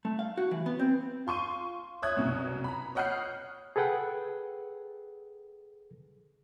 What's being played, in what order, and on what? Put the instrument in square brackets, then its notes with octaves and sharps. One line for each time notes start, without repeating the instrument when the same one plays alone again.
[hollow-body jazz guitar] A3
F5
F#4
E3
B3
C4
[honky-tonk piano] F4 C6 C#6 D#7
C#5 E5 D#6 F#6 G#6
C2 F#2 B2
A#5 B5
C#5 D#5 F#5 F6 G6 C7
[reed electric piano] G#4 A4 B4 F#5 G5